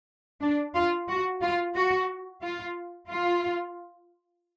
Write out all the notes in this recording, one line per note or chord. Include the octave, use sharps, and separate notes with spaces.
D4
F4
F#4
F4
F#4
F4
F4